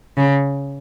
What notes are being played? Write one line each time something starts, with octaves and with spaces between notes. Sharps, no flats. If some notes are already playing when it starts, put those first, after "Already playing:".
C#3